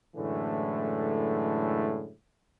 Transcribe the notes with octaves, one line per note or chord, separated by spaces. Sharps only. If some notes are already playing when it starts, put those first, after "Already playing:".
F#2 A2 D3 E3 G#3 A3